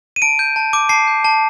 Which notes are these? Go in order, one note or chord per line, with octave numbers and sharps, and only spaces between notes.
D#7
A5 D7
G6
A5
D6
A5 C7
G6
A5